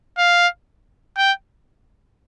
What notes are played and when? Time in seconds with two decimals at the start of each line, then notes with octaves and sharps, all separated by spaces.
0.18 F5
1.17 G5